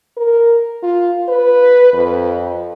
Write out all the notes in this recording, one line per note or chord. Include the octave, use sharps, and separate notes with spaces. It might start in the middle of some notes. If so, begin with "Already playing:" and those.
A#4
F4
B4
F2